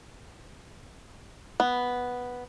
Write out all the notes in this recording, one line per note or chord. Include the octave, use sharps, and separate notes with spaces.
B3